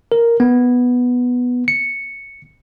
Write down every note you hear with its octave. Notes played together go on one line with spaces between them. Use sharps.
A#4
B3
C#7